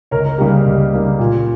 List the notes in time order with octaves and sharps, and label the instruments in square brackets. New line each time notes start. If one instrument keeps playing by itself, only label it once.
[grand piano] C#2 A#4 C#5
A#4
C#3 G3 A#3 G4
A#4
C#2
C#3 G3 A#3
A#2